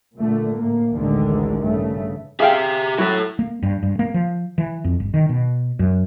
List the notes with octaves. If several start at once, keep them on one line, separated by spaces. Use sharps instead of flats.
A#2 D3 A3
A2 A#3
A1 D2 D3 D#3 G#3
G2 C#3 A3
G4 G#4 E5 F5 G5
F#3 E4 A4
A#3
G2
G2
A#3
F3
E3
F2
G1
D#3
B2
F#2